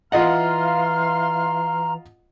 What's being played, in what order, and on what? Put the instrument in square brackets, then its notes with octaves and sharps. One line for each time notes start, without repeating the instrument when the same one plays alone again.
[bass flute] E3 [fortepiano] F4 D#5 F#5 [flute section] F5 C6 F6 [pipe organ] A#5